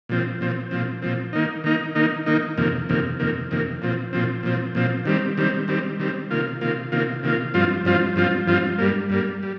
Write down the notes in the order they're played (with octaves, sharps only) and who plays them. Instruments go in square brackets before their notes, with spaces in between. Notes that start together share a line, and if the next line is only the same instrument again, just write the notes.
[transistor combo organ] A#2 F3 C4
A#2 F3 C4
A#2 F3 C4
A#2 F3 C4
D#3 A#3 D#4
D#3 A#3 D#4
D#3 A#3 D#4
D#3 A#3 D#4
F2 C3 D#3 A#3
F2 C3 D#3 A#3
F2 C3 D#3 A#3
F2 C3 D#3 A#3
A#2 F3 C4
A#2 F3 C4
A#2 F3 C4
A#2 F3 C4
D#3 G3 C4
D#3 G3 C4
D#3 G3 C4
D#3 G3 C4
C3 D#3 A#3 F4
C3 D#3 A#3 F4
C3 D#3 A#3 F4
C3 D#3 A#3 F4
G2 F3 C4 F4
G2 F3 C4 F4
G2 F3 C4 F4
G2 F3 C4 F4
G2 G3 A#3
G2 G3 A#3
G3